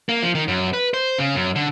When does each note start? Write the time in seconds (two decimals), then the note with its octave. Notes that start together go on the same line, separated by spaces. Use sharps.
0.09 A#3
0.23 F3
0.35 D#3
0.48 F#2
0.73 B4
0.94 C5
1.19 C#3
1.35 F#2
1.56 D3